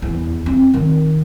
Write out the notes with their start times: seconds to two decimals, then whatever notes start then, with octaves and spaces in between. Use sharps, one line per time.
0.02 E2
0.46 C4
0.74 D#3